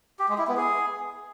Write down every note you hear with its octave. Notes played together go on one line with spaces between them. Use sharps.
G4
G#3
E4
B3
G#4